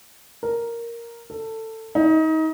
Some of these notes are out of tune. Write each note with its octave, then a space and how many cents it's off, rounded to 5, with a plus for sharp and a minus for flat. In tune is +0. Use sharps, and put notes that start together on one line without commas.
A#4 +0
A4 +20
D#4 +30